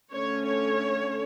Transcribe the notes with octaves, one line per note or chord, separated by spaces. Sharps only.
D3 A3 C#4 C#5
C#5